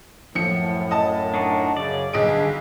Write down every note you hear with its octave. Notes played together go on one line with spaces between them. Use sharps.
F#2 A2 F3 C#7
D#5 A5
D4 D#4 F#4
F#2 C#3 D5
B1 G2 D3 G#4 D#5 D7